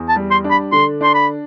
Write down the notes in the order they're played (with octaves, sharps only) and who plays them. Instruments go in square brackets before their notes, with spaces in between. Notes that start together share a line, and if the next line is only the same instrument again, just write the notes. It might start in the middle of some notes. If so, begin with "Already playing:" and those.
Already playing: [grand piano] E2
[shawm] A5
[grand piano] G3
[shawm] C6
[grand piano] D4
[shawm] B5
[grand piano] D3 [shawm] C6
[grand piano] D4 [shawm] C6
[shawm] B5